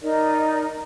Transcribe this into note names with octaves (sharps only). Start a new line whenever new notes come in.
D#4 A#4 D5 D#5